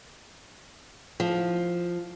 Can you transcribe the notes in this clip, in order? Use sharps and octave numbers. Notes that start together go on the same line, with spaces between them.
F3